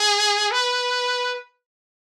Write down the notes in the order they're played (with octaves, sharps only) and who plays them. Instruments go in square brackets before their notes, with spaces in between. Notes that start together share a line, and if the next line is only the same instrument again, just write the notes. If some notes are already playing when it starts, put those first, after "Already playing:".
Already playing: [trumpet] G#4
B4